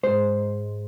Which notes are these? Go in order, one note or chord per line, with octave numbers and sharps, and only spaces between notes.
G#2 G#3 C5